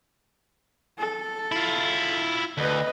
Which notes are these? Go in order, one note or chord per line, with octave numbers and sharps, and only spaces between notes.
A4
E4 F4
D2 B4 D#5